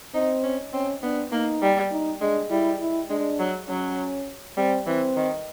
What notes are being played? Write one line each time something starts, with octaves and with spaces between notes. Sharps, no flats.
C4 D#4
C#4
C4 C#4
B3 D4
A#3 D#4
G3
D#4
G#3 D4
G3 E4
E4
G#3 D4
F#3
F#3 C#4
G3 C4
E3 C4
D#3